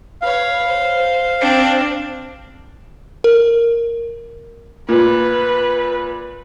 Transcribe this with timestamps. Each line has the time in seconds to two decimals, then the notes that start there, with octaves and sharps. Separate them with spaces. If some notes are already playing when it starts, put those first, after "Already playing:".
0.22 B4 C#5 F5
0.68 C5
1.40 C4 D4
3.24 A#4
4.89 A#2 B4